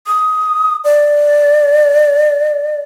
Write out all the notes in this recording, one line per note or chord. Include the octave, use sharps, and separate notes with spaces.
D#6
D5